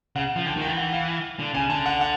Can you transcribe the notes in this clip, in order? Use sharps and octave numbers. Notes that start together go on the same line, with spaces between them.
C#3 F#5
F3
D3 G5
D#3 G5
E3
F#5
F5
D3
C#3 G#5
D3 A5
F#5
F#5